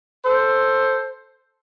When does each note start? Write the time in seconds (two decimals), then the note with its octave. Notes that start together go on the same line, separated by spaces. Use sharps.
0.25 A4 C5